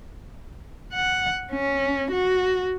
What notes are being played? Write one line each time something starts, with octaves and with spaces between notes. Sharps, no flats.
F#5
C#4
F#4